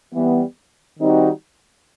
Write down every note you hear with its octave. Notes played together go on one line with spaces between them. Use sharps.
E3 G3 B3
D#3 G3 C4 D#4 F#4